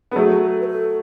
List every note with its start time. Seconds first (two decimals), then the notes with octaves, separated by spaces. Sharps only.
0.11 B3 A4
0.16 F#3 A3 G#4
0.31 G#4
0.42 A4
0.61 B4
0.68 A4